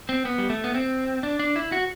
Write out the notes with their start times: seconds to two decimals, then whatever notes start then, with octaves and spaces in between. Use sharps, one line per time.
0.09 C4
0.25 B3
0.38 G3
0.50 A3
0.64 B3
0.74 C4
1.23 D4
1.39 D4
1.56 E4
1.72 F#4